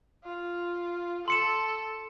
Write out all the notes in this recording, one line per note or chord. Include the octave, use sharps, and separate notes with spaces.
F4
A4 C6 C#7 E7